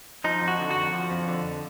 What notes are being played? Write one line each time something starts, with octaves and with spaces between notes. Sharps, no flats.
F3 D#4
F2
F#4
D3
F#4
F2
F3
F2
D3